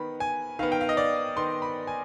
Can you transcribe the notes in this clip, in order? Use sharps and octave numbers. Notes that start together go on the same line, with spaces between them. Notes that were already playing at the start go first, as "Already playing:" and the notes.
Already playing: D#3 B3 B5
G#5
D#3 B3 F5
G5
F5
D#5
D5
D#3 B3 C6
B5
G#5